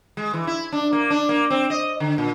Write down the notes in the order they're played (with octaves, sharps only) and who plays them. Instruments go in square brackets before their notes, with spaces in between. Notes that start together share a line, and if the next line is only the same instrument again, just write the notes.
[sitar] G#3
E3
E4
D4
A#3
D4
A#3
C4
D#5
D3
A#2